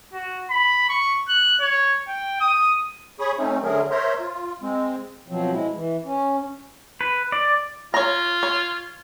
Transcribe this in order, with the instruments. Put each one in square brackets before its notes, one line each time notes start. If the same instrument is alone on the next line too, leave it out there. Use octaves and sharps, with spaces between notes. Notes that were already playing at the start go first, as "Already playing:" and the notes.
[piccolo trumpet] F#4
B5
C#6
F#6
C#5
G5
D#6
[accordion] G#4 C#5 B5 C#6 D#6
A3 C4 C#4 D#4
D3 F#3 A3 G#4 A#4
A#4 C5 C#5 E5 A#5 C6
F4
G#3 C4
[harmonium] B2 F3 F#3 C4
G#3 E4
E3
C#4
[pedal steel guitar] B4
D5
[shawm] F4 [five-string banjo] C#5 A#5
[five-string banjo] C#5